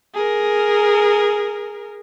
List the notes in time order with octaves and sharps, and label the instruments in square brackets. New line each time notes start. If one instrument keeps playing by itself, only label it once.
[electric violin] G#4 A#4